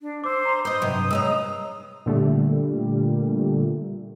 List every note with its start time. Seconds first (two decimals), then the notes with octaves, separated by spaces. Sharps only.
0.01 D4
0.24 C5 D6 E6
0.45 A#5 C6
0.65 C5 D#5 B5 D#6 G6 G7
0.82 G2 C3 F#3
1.11 G#3 C#5 D#5 A5 A#5 E6
2.06 A#2 D3 G3 A3